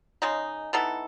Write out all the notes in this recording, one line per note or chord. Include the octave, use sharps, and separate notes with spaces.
C#3 G#3 D#4
E3 B3 D#4 A4